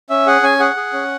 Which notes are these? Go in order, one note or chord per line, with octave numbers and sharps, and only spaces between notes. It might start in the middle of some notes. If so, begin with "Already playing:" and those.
C#4 E5
G#4 F#5
C#4 G#5
G#4 F#5
G#4
C#4